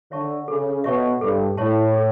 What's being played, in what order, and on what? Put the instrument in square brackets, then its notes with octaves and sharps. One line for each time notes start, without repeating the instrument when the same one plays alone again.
[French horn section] D3 [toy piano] C#5 E5 A5 C#6
[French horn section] C#3 [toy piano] A4
[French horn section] B2 [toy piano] C#5 E5 A5 C#6
[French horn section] G2 [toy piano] A4
[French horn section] A2 [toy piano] C#5 E5 A5 C#6
[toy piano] A4